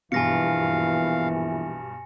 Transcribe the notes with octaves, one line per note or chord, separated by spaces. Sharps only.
A#1 G2 B2 E3 F5 G#5 A#6 C#7